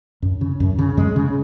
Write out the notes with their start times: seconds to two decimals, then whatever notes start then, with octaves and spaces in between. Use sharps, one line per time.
0.22 F#2
0.41 C#3
0.60 F#2
0.79 C#3
0.97 F#2 G#3
1.16 C#3